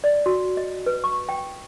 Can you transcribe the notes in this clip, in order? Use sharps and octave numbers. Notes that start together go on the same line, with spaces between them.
D5
F#4
D#5
B4
C#6
G5